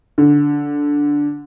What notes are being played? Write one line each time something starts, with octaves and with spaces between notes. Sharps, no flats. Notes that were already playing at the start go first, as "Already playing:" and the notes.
D3